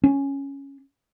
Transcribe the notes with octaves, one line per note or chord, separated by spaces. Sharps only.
C#4